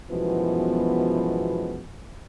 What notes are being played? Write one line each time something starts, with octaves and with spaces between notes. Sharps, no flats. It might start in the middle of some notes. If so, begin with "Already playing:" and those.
F#2 B2 E3 F3 G#3 B3